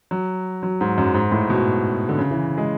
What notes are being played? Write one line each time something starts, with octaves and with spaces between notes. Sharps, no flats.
F#3
F#3
G#2
F#2
G#2
A2
B2
D3
C#3
E3
G#3